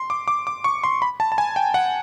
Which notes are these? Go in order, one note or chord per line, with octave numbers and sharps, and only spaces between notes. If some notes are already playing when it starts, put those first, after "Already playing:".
Already playing: C6
D6
D6
D6
C#6
C6
B5
A5
A5
G#5
G5
F#5